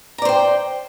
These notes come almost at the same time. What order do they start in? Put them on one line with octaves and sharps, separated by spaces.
A#5 D5 C5 G5